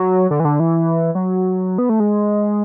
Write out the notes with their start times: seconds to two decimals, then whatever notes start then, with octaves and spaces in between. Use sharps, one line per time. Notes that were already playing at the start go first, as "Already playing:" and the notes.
Already playing: F#3
0.31 D3
0.40 E3
0.45 D3
0.60 E3
1.15 F#3
1.78 B3
1.89 A3
2.00 G#3